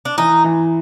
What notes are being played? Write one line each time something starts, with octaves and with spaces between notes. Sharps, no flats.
D4
E3 D#4
E3